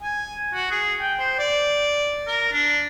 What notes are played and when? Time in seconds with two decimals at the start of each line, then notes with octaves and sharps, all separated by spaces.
0.02 G#5
0.54 F#4
0.71 G#4
1.01 G5
1.19 C5
1.39 D5
2.27 A#4
2.53 D4